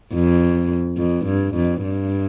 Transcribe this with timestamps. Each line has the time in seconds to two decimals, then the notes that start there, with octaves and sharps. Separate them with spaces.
0.13 F2
0.97 F2
1.25 G2
1.54 F2
1.83 G2